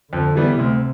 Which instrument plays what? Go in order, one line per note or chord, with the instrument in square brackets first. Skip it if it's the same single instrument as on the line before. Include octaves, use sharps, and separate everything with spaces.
[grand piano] F2 [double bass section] D3
[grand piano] E3 G3 B3
[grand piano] D2 [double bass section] C3